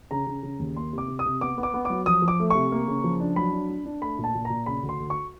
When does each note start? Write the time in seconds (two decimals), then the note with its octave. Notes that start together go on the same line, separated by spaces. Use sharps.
0.11 C#3 A#5
0.27 C#3
0.43 C#3
0.59 D#2
0.76 A#3 C6
0.93 C3 D6
1.08 C3
1.19 D#6
1.25 C3
1.41 B3 D6
1.58 B3
1.63 D6
1.74 B3
1.85 F#3 D6
2.06 F3 D#6
2.22 F3
2.28 D6
2.39 A3
2.50 C3 C#6
2.72 A#3
2.88 C#3
3.04 F3
3.20 D4
3.36 F#3 B5
3.53 D4
3.69 D4
3.85 D4
4.01 A3 B5
4.19 A#2
4.24 A5
4.35 A#2
4.45 A#5
4.50 A#2
4.66 C#3 B5
4.83 D2
4.89 C6
5.00 D2
5.10 C#6